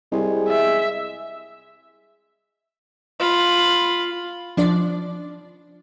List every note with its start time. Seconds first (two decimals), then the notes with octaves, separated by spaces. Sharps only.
0.12 C2 G#3
0.49 E5
3.20 F4 B5
4.57 F3 D4 D5